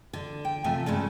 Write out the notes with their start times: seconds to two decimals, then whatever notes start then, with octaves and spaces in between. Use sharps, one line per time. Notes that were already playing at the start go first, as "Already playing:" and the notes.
0.13 D3
0.45 G5
0.64 C3 F3 A3 E5 G#5
0.86 G2 C#3 G#3 A3